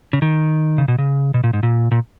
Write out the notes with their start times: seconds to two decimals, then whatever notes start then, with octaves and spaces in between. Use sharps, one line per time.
0.13 C#3
0.22 D#3
0.78 C#3
0.88 B2
0.98 C#3
1.34 B2
1.44 A#2
1.53 G#2
1.63 A#2
1.91 A#2